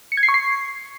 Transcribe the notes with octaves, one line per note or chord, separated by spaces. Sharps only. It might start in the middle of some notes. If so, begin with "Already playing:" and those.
C#7
G#6
C7
C#6
C7